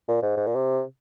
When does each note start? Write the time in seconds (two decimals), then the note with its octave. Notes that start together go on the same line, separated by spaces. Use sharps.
0.08 A#2
0.22 G#2
0.37 G#2
0.47 A#2
0.55 C3